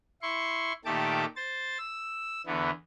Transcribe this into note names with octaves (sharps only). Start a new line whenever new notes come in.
E4 C6 C#6
A#2 D#3 A3 G4 A5 D6
C5 A6
E6
E2 D3 E3 B3